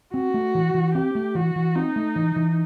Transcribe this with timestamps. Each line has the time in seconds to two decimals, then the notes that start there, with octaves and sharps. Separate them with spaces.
0.14 C4 F#4
0.34 A3
0.55 E3
0.75 E3
0.95 C4 G4
1.15 A3
1.35 E3 F#4
1.56 E3
1.75 C4 D#4
1.96 A3
2.16 E3
2.36 E3